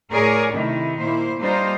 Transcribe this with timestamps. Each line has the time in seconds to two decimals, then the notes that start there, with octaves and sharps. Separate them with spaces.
0.11 A2 G#4 A#4 C#5 D5
0.53 C3 D#3 A3 E4
0.98 A#2 A#3 E4 C5
1.38 G3 A#3 D4 D#4 F4 C5